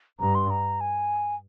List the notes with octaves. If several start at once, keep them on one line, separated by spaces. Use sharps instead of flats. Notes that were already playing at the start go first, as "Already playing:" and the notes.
G2 A#5
C6
A#5
G#5